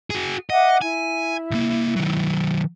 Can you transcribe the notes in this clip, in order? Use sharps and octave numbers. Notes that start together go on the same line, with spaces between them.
F#4 G#4
D#5 E5 F#5 D6
E4 G#5
C2 A#3
D#3 F#3